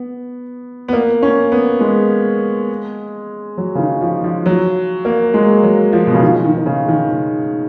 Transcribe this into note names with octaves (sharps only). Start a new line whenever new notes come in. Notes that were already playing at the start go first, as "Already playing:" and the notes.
Already playing: B3
B3
A#3
C#4
B3
G#3
F#3
C#3
D#3
F3
F3
F#3
A#3
G#3
F#3
F3
B2
C#3
D#3
D#3
D#3
C#3
D#3
C#3